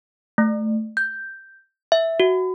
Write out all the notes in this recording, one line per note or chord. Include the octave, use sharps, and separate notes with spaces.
A3
G6
E5
F#4